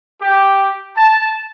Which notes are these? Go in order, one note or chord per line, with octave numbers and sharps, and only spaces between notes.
G4
A5